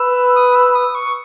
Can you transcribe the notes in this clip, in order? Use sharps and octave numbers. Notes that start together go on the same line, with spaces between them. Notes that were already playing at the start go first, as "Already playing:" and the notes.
Already playing: B4 E6
D#6
E6
D#6
C#6